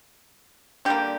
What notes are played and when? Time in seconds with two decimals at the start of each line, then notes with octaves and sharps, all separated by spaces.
0.85 D3 G3 A#3 G4